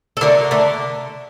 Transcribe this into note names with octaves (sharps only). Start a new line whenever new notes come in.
A4
D3 A3 A#4
D3 A3